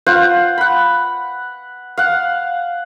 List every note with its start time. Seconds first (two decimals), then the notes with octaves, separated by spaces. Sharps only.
0.06 F4 C5 F5 F#5
0.58 F#5 B5
1.97 F5 F#5